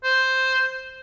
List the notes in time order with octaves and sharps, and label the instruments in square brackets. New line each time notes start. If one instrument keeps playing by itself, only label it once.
[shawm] C5